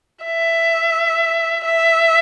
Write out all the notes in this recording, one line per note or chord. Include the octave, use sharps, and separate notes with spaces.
E5
E5